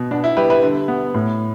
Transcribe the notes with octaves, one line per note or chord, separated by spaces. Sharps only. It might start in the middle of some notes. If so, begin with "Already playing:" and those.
Already playing: B2
B3 D4
E4
G3 G4 B4
B4 E5
D3
B3
A2